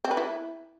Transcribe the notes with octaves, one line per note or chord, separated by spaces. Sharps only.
C4
B4
E4